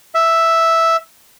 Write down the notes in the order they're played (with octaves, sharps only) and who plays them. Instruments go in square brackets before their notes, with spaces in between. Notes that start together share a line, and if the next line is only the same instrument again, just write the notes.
[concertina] E5